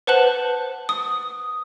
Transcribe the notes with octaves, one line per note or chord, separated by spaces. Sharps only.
B4 C5 F#5 A5 F#6 F#7
D#6